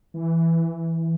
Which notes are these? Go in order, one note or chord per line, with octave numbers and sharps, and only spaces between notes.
E3